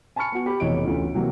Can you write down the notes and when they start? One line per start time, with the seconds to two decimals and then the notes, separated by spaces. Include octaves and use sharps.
0.16 G#5 A5 B5 C#6 F6 C#7
0.32 B3 F#4
0.46 G4 B5
0.60 F1 B2 E3 C#5 D#5 D7
0.83 D2 D3 E3 C#4 F4 C#5
1.14 C3 E3 F#3 A#3